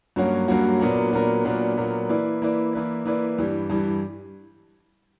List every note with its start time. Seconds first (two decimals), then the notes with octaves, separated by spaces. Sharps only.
0.16 G2 F#3 A#3 C#4 F#4
0.48 G2 F#3 A#3 C#4 F#4
0.80 A#2 F#3 B3 D4 A#4
1.13 A#2 F#3 B3 D4 A#4
1.45 A#2 F#3 B3 D4 A#4
1.77 A#2 F#3 B3 D4 A#4
2.09 E3 A#3 E4 B4 D5
2.42 E3 A#3 E4 B4 D5
2.73 E3 A#3 E4 B4 D5
3.05 E3 A#3 E4 B4 D5
3.38 G2 E3 G3
3.70 G2 E3 G3